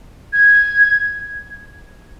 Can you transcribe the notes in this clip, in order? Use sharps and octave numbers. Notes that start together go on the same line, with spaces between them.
G#6